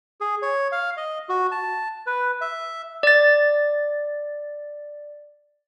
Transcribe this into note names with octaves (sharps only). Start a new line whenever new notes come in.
G#4
C#5
F5
D#5
F#4
A5
B4
E5
D5 A6